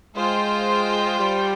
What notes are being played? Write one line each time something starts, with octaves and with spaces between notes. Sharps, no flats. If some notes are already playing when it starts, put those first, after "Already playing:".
G#3 F4 C5 G5
G3